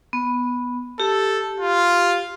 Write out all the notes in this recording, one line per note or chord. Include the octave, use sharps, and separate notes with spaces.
B3
G4 A4
F4